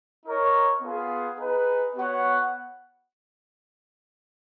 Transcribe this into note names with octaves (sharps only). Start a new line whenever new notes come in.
D#4 A#4 C#5
B3 F4 G#4
D#4 G#4 B4
B3 F#4 C#5 F#5